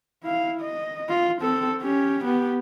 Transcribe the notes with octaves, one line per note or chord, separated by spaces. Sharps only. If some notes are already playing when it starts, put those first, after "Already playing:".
E4 F5
D#5
F4
C4 A4
C#4 G4
B3 G4